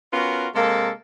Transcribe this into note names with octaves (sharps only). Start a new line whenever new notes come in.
B3 C#4 F4 F#4 A#4
C3 G#3 A#3 A4